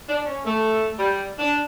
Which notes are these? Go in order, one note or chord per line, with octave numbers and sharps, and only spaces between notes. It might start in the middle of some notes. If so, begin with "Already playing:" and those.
D4
C#4
A3
G3
D4